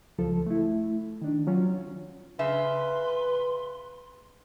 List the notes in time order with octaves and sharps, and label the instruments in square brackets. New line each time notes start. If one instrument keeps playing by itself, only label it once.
[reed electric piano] C#2 F3 A4
A3 E4
D#3 D4
F#3 C#4 F4
[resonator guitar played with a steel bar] C#3 E5 [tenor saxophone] B4 [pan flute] C6